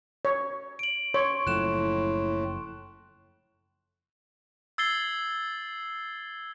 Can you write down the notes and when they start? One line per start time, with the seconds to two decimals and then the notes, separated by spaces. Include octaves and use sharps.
0.25 C#5
0.79 D7 F#7
1.14 C#5 C6 C#6
1.47 F#1 A2 F3 F#6 E7
4.78 E6 G#6 A6 C7 G7